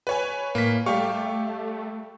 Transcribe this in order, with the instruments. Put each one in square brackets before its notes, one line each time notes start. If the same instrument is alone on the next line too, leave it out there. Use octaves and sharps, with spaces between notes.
[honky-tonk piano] B4 C#5 G#5
[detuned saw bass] A2 [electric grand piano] A#3 B6
[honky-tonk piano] G3 G4 [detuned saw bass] A3 [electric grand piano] F5 C#6